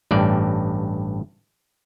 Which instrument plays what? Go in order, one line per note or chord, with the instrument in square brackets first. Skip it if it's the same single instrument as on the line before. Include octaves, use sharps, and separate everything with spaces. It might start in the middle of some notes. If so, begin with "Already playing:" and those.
[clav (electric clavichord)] A1 G2 D5